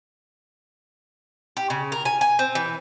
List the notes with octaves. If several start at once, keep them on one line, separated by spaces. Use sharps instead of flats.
G4
C#3
A#4
G#5
G#5
C4
E3